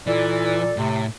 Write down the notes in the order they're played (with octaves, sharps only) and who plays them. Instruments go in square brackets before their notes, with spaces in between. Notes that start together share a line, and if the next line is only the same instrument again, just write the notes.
[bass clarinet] A#2 [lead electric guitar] E3 [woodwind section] A4 D5
[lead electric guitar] A2 [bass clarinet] C3